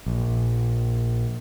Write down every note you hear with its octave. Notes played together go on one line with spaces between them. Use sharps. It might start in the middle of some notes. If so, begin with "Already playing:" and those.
A#1